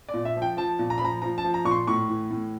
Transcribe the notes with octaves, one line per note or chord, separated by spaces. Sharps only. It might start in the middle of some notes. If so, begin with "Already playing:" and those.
D5
A#2
E5
F3
G5
F3 A5
A#2
A#5
B5
F3 A#5
F3 A#5
A5
F3
A#5
A#2 C#6
C6
A2 C#6
E3
A2